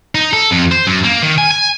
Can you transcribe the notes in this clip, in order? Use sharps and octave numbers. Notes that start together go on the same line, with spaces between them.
D#4
A4
F2
C5
F#2
A#3
D#3
G#5
G#5